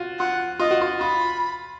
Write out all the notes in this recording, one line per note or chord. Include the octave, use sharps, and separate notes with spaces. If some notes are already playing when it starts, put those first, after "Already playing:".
Already playing: F4 F#4
F4 F#5
F4 D#5
F#4
F4
F4 B5